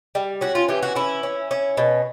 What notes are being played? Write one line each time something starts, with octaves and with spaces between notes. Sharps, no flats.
G3
C#4 F#4
F4
E3 G4
F#4
C#4 E4
C#4
C#4
B2